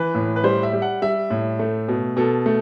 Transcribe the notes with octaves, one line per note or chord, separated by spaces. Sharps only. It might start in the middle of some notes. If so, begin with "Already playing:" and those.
Already playing: E3 B4
A2
B4
G3 C5
E5
G3
F#5
G3 E5
A2
A3
B2
B2 A4
A3